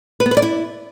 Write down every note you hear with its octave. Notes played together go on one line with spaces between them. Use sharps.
B4
B3
B4
D5
E4